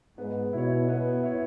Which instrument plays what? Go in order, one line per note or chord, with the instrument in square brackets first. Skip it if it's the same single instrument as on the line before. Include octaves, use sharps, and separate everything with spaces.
[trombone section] G#2 [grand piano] B3
[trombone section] B2 [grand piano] E4 C#5
[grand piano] B3
E4 C#5